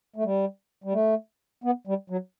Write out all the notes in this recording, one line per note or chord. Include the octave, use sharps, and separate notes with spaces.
A3
G3
G3
A3
B3
G3
F#3